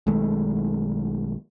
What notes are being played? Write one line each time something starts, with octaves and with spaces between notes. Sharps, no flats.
B1 D#3 G#3 A3